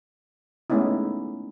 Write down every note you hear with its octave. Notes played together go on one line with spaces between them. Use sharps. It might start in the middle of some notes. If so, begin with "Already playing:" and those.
G#3 A3 B3 C#4 D#4 E4